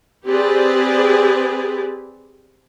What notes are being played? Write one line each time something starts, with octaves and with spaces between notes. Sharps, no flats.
C4 G4 G#4 B4 D5